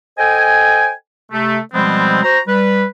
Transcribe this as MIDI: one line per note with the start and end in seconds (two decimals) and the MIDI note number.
0.18 0.91 69
0.18 0.91 72
0.18 0.91 75
0.18 0.91 79
0.18 0.91 80
1.32 1.58 48
1.32 1.58 57
1.74 2.20 47
1.74 2.20 53
1.74 2.20 55
1.74 2.20 56
1.74 2.20 59
1.74 2.20 60
2.23 2.40 66
2.23 2.40 72
2.23 2.40 82
2.47 2.84 55
2.47 2.84 71